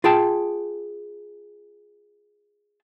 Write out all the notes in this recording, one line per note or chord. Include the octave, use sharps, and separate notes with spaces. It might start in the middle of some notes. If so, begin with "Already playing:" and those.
F4 G#4 G5 A5